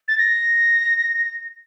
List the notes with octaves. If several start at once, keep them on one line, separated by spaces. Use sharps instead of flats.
A6
A#6